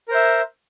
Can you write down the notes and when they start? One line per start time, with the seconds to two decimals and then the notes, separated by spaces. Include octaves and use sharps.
0.08 A#4
0.11 C5
0.14 E5